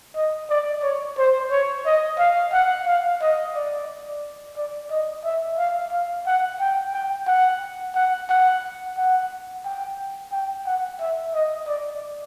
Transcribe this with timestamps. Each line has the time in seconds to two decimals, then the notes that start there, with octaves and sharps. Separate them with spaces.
0.16 D#5
0.50 D5
0.83 C#5
1.18 C5
1.51 C#5
1.86 D#5
2.19 F5
2.53 F#5
2.86 F5
3.21 D#5
3.55 D5
4.57 D5
4.90 D#5
5.24 E5
5.58 F5
5.92 F5
6.26 F#5
6.60 G5
6.93 G5
7.27 F#5
7.95 F#5
8.29 F#5
8.97 F#5
9.65 G5
10.32 G5
10.66 F#5
11.00 E5
11.34 D#5
11.67 D5